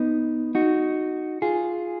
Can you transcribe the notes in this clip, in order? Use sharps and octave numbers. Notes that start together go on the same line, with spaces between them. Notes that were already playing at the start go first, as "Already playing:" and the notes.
Already playing: B3 D#4
D#4 F#4
F4 G#4